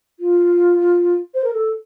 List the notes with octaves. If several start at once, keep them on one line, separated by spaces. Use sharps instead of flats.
F4
C5
A#4
A4